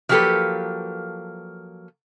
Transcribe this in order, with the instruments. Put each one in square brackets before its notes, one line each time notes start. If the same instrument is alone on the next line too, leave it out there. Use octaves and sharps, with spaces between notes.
[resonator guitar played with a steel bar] F3 F#3 A#3 G4 A4 B4